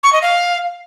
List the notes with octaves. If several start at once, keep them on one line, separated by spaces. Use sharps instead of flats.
C#6
D#5
F5